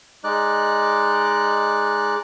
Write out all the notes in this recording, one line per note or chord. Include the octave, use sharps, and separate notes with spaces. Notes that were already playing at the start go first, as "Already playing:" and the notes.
G#3 D#4 D5 F#6